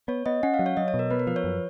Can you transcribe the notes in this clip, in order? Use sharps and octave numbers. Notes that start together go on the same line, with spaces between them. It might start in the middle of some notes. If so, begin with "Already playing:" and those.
B3 C#5
B3 D#5
C#4 F#5
F5
F#3
C#5
F#3 D#5
C#5
B2
A#4
B3 B4
A#4
F3 B4
C#5
F#2